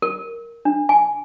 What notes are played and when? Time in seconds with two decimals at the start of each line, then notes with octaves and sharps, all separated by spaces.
0.02 A#4
0.65 D4
0.89 G#5